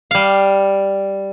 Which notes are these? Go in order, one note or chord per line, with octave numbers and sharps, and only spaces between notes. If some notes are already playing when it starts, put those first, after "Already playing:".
G3 F5